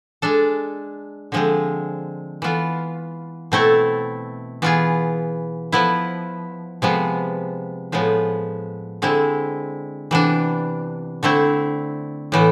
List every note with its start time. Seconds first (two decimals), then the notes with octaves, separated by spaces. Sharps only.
0.22 G#3 D4 A4
1.32 D3 F3 G#3 C4
2.42 E3 B3 F4
3.52 B2 A3 C4 E4 A4
4.62 E3 B3 F4 G#4
5.72 F3 B3 E4
6.82 C3 F3 G#3 B3
7.92 A2 F3 G#3 B3
9.02 D3 G#3 C4 E4
10.11 C3 E3 B3 D4
11.23 D3 A3 C4 E4
12.32 A2 E3 B3